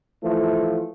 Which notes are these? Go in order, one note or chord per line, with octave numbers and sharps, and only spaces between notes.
E3 F3 A3